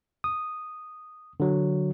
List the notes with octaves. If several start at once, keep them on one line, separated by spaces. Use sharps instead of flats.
D#6
D3 F#3